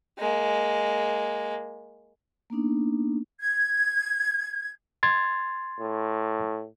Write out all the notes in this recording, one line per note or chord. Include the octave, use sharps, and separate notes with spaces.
G#3 A#3
A#3 B3 D4 D#4
G#6
C6 G#6 A6
A2